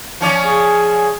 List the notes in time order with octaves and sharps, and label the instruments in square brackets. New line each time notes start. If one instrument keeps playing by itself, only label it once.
[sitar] F3 C#4 D5
[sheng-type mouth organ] G#4